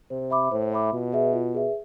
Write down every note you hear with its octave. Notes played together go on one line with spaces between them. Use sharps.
C3 C5
E5 B5 D6
A2 C5
E5 B5 D6
B2 F4
G#4 B4 E5
F4
G#4 B4 E5